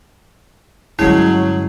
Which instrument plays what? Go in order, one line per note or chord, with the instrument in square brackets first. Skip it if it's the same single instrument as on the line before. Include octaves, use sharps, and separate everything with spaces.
[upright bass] G2 D3 [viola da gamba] F#3 [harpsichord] G#3 C#4 [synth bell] E4